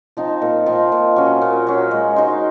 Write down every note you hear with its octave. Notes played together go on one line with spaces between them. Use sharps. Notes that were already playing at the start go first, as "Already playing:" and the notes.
F3 C4 D#4
A#2
F3 C4 D#4
A#2
F#3 C#4
A#2
F#3 C#4
G#3
D#4 F#4 C5